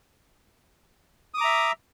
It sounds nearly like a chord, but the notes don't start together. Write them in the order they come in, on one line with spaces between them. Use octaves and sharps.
D#6 D6 A#5 E5